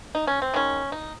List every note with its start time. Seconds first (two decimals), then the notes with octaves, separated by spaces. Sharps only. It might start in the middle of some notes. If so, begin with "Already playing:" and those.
0.15 D#4
0.27 C#4
0.42 C4
0.54 D#3 G#3 C#4
0.92 D#4